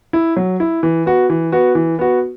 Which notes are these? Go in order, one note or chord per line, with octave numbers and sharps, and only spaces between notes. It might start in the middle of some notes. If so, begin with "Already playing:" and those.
E4
F#3
E4
E3
B3 F#4
E3
B3 F#4
E3
B3 F#4